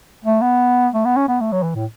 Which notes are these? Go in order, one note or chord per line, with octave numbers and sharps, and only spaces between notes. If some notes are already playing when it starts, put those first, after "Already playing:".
A3
B3
A3
B3
C#4
B3
A3
F#3
E3
A2